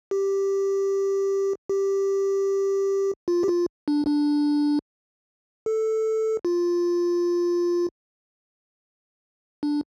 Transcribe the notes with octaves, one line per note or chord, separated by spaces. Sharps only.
G4
G4
F4
G4
F4
D4
D4
A4
F4
D4